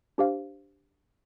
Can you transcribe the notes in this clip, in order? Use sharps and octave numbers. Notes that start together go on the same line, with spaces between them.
D4 G4 C5 F5